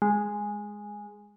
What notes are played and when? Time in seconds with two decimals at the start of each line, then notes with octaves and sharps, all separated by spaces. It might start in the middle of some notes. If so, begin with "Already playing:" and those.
0.02 G#3